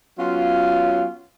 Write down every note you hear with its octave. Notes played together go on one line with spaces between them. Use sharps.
F#3 B3 C#4 F4